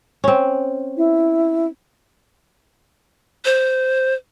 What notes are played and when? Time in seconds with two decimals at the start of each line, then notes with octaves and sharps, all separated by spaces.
0.24 C4 C#4
0.97 E4
3.45 C5